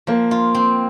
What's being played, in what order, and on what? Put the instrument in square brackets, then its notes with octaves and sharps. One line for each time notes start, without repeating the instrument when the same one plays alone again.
[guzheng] F3 [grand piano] A#3
[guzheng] F4
C4